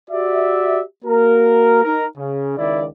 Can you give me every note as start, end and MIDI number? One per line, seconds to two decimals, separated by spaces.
0.11 0.82 66
0.11 0.82 67
0.11 0.82 74
0.11 0.82 76
1.05 1.83 58
1.05 1.83 66
1.05 1.83 70
1.84 2.05 63
1.84 2.05 70
2.18 2.56 49
2.57 2.85 37
2.57 2.85 51
2.57 2.85 64
2.57 2.85 74